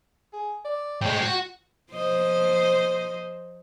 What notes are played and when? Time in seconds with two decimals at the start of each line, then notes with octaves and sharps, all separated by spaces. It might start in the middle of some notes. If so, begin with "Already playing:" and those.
0.33 G#4
0.65 D5
1.01 A2 G#3 G5
1.22 F#4
1.92 F3 C5 D#5